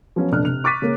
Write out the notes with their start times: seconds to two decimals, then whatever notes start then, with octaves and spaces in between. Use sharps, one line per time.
0.16 F3 F#3 B3 C#4 F4
0.31 F1 A#1 D4 F6 F#6
0.45 C3 F7
0.64 C#6 D6 F#6 A6 B6 D#7
0.82 C#3 G#3 A#3